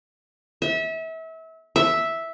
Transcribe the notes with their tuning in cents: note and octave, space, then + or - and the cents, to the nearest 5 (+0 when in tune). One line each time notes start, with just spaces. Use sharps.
E5 -30
E5 -5